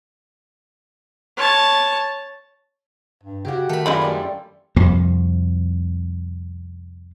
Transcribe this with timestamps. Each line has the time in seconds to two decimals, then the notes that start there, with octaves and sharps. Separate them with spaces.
1.37 C#5 A5
3.23 G2
3.45 C#3 F#4 G4
3.69 D#3 A3 B5
3.86 F#2 E3 G#3 D4 F4 A4 B5
4.02 G3 A3
4.76 C2 F2 F3 A#3